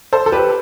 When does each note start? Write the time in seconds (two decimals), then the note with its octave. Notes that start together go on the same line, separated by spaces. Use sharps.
0.13 A4 C5
0.26 A4
0.32 G4 B4